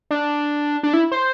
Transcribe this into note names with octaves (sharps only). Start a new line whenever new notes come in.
D4
D4
E4
C5